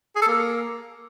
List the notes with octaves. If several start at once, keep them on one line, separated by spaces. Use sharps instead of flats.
G#4
A4
A#3